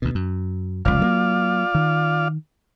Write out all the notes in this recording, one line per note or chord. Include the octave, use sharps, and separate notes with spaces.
D2 B2
F#2
F1 C#2 F4 D5 F5
F#3 A3 A#3
D#3